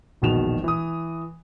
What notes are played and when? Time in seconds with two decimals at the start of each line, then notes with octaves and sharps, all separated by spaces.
0.22 E1 A#1 B2 D#3 E7 F7
0.64 E3 D#6